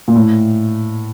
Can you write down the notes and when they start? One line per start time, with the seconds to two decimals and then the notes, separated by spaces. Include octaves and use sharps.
0.08 A#2
0.15 A2